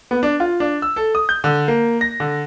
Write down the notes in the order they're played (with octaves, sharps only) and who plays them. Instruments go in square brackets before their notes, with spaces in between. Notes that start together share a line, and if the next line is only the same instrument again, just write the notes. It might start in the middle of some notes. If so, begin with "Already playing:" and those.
[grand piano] B3
D4
F4
D4
E6
A4
D#6
G6
D3
A#3
A#6
D3